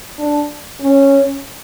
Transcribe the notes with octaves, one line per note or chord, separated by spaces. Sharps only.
D4
C#4